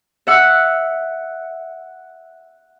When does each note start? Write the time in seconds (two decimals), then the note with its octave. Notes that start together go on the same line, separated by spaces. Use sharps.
0.27 E5 F#5 E6